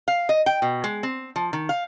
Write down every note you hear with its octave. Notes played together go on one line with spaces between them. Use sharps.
F5
D#5
G5
B2
G#3
C4
F3
D#3
F5